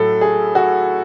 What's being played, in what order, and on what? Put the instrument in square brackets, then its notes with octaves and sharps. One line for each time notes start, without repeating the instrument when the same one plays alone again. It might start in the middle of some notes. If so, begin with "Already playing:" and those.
Already playing: [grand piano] A2 F#3 A3 A4
G#4
F#4